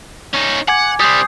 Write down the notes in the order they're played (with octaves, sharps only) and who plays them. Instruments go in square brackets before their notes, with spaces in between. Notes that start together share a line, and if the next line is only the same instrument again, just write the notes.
[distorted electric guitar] C#4 D#4
[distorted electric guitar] F#5 [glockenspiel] G#5 D6 G#6
[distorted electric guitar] G3 C4 [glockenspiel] D#6 G6 C7